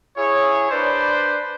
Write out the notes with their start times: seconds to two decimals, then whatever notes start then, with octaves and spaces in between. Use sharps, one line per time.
0.16 E4 G#4 C#5
0.71 D4 B4 C5 D5